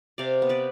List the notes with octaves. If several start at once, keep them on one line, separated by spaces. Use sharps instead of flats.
C3 D5 F5
B3
B4 D5